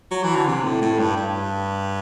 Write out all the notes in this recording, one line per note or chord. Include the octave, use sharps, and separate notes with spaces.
F#3
E3
D3
C3
A2
A2
G2
G2